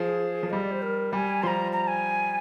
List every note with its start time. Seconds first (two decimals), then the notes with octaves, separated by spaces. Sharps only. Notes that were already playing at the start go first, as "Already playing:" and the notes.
Already playing: F3 G#4
0.43 F3
0.50 G3 D#5
0.61 D5
0.71 C5
0.82 A#4
1.13 G3 G#5
1.43 F3 A#5 C6
1.72 A#5
1.87 G#5